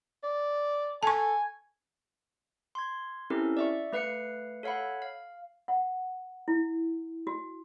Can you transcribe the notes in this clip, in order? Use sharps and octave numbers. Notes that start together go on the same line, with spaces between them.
D5
A4 G#5 A5 C#6
C6 G#6
C4 C#4 E4 G4 A4 A#4
D5 E5 C#6
A3 B4 F5 C7 C#7
A4 C#5 F5 F#5 B5
F5
F#5
E4
F#4